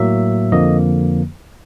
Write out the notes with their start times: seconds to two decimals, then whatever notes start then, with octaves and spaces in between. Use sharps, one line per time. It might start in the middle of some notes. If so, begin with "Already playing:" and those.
Already playing: A2 F#3 A#3 E5
0.52 F2 D3 F3 A#3 D#5